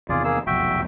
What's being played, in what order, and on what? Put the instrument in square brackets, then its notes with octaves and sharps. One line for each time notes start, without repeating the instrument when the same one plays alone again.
[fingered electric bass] E2 C3 D#3 [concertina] F4 G#4 D5
[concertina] A#3 G#4 E6
[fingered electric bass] F1 B1 E2 [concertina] F#4 E5 G5